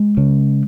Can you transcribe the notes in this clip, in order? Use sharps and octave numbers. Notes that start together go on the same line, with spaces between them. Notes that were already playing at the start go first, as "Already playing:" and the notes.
Already playing: G#3
C#3